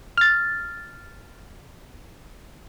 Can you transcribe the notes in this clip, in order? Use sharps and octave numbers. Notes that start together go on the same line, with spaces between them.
F6 A6